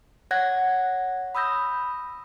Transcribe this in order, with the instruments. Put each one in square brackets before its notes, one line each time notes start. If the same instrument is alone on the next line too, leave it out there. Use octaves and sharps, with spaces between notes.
[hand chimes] C#5 F#5 F#6 G#6 A#6
B5 D#6 E6 G6 A#6